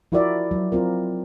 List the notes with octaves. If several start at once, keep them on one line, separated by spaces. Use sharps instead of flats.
F3 E4 F#4 A#4 D5 E5
F#3
C4 F4 A#4